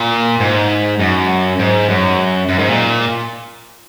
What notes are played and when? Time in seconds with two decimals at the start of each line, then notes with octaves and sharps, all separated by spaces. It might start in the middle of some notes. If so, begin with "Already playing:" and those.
Already playing: A#2
0.40 G#2
0.99 F#2
1.59 G#2
1.89 F#2
2.49 F#2
2.59 G#2
2.68 A#2